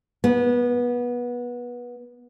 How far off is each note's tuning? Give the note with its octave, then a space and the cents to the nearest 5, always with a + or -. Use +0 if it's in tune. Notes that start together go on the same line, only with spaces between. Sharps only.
B3 -20